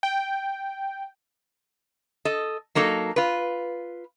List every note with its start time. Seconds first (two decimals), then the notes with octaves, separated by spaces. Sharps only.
0.03 G5
2.25 A4 D#5
2.75 F#3 A#3 D#4 A4
3.16 F4 B4